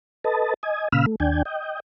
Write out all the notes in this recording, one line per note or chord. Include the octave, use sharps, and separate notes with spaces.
A4 B4 D#5 A5
D#5 G#5
A#2 C#3 F5 B5 E6 F6
A3
D#2 D4 G5 G#5
D#5 G5